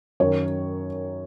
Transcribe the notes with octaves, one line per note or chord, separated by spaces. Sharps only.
F#2 D#3 C#5